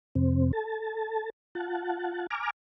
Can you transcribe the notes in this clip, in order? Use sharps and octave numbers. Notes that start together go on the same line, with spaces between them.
F2 C3 C4
A4 A5
F4 F#5 A5
G#5 A#5 D6 F6